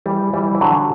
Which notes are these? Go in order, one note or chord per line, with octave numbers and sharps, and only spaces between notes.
E3 G3
E3 G3
E3
D3 F#3